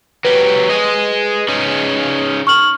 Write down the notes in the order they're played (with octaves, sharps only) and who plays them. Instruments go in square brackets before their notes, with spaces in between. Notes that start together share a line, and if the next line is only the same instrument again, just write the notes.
[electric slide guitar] F#3 G4 [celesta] B4
[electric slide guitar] G#4 D#5
C#4 D#4 G#4
[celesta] C#6 F6 F#7